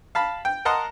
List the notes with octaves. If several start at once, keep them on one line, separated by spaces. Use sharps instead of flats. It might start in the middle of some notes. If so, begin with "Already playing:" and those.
F5 A5 B5
G5
A#4 D#5 F#5 A5 A#5 C6